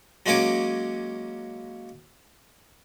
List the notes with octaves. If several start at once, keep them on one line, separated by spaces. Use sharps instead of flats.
F#3 G#3 A#3 C#4 G#5 D6